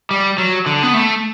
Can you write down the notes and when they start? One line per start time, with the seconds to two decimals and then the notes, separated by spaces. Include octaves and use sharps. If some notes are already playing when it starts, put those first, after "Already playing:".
0.11 G3
0.38 F#3
0.66 D3
0.83 B3
0.94 A3